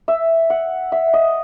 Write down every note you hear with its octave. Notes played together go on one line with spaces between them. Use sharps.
E5
F#5
E5
D#5